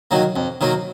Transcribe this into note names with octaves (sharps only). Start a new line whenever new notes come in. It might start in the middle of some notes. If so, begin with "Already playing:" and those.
D#3 F#3 A#3
F2
D#3 F#3 A#3